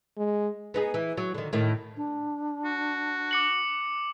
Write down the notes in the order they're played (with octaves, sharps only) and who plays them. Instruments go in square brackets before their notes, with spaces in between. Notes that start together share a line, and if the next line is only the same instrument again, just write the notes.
[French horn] G#3
[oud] B3 D#4 G#4
E3
F#3
D3 D#3
A2 D#3
[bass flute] D4
[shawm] F#4
[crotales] D6 C#7 F#7